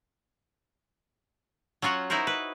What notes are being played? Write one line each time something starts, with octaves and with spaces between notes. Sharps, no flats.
F#3 C#4 F4 F#4 F#5
D#4 E4 F#4 A#4 C5
B4